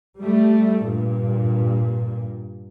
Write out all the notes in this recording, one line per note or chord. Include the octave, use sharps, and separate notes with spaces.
G3 A3
G2 A#2